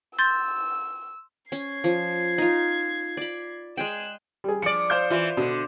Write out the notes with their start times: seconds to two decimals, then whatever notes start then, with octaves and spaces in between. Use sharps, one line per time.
0.19 C6 E6 G6 A6
1.52 C#4 G#6 C7
1.84 F3
2.38 D#4 F4
3.17 D5 B5
3.77 G#3 G#4 G5 F#6 E7
4.44 G3 G#4
4.62 F3 D5 C#7 D7
4.90 C5 F5 G6
5.11 E3 F4
5.37 B2 D3